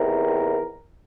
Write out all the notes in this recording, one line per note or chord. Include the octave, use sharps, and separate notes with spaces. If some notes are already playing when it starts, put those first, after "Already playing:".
Already playing: E2 C3 D#3 A#4